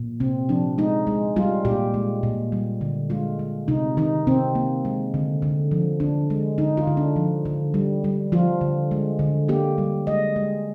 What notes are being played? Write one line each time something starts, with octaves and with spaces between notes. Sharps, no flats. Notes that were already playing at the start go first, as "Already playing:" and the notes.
Already playing: A#2
C3 C4
F3 D4
G#3 D#4
G#3
G3 F4
A#2 G4
G#3
A#2
G3
D3
G#3 F4
G#3
C3 D#4
D#3 D#4
C3 C4
A#3
G#3
D3
D3
F3
D3 D4
G#3
D3 D#4
F4
D3
D4
F3
D3
G3
G3
F3 F4
D3
G#3
D3
A#3 G4
G3
G#3 D#5
G#3